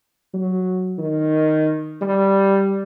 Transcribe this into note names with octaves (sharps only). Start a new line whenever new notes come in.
F#3
D#3
G3